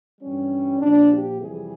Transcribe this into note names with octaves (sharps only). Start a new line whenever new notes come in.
G2 E3 G3 C#4
A#2 F3 D4
G4
F2 C3 E3 G3 G#4